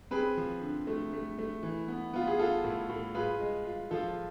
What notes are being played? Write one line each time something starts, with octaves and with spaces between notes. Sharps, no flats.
C4 G#4 B4
F3
D3
A3
A3
A3
E3
B3
B3 F4
G#4
F4 A4
A2
A2
F4 G#4 B4
G#3
F4
F3 F4 A4